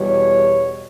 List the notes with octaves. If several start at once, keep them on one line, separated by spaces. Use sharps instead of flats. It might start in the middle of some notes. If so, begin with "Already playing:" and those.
Already playing: E2 B2 G3 C#5